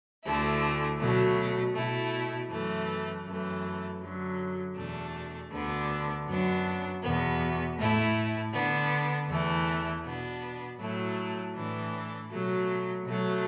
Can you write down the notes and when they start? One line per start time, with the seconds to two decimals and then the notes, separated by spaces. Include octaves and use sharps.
0.23 D2 D3 A3 E4
0.98 B2 F#3 A3
1.74 B2 A3 E4
2.49 F#2 E3 A3
3.25 F#2 E3 A3
4.00 F#2 D3 F#3
4.75 E2 B2 A3 D4
5.50 D2 D3 B3 D4
6.27 F#2 F#3 B3 D4
7.02 E2 B2 B3
7.77 A2 A3 E4
8.53 D3 B3 D4
9.28 E2 E3 A3 E4
10.03 B2 B3 D4
10.79 A2 F#3 A3 E4
11.54 A2 E3 D4
12.29 B2 F#3 A3
13.04 B2 F#3 A3